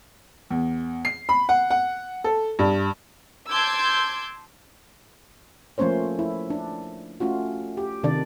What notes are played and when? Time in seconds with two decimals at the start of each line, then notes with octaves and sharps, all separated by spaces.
0.51 E2
1.05 C7
1.29 B5
1.49 F#5
1.70 F#5
2.24 A4
2.59 G2
3.51 A5 C6 D6 E6 G6 G#6
5.78 F3 A3 A#3 C#4 C5 C#5
6.19 E4
6.50 D4
7.20 A3 C#4 F4 F#4
7.77 G4
8.03 C3 D#3 D4 D5